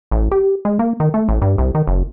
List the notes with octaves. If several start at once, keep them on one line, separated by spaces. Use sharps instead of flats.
A1
G4
G#3
A#3
D#3
A3
A1
G2
C2
D#3
F#1